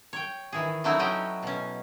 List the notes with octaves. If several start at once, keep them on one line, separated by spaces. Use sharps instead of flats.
C#5 G5
D#3 E3 G#4
F#3 A3 C4 D#4 E4 F#4
F#3 C#4 E4 F#4 D#5 G5
B2 C#4